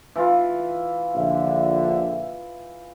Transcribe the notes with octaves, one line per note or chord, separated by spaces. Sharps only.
E3 F4
A#1 D3 E5